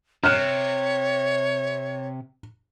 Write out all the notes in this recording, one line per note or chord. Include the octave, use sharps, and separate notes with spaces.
C3 C#5 F6 F#6 E7